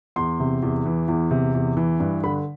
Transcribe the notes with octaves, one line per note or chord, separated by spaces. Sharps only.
E2 C6
C3
E2
E3
E2
C3
E2
E3
G2
D3 B5